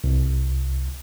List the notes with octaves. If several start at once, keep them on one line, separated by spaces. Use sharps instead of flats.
C2